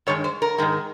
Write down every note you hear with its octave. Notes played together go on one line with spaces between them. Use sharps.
G2 D#3 G#3 C#5
C5
A#4
G#2 D#3 G#3